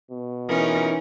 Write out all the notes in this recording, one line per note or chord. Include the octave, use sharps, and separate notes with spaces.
B2
E3 C#4 D#4 F4 G#4 A#4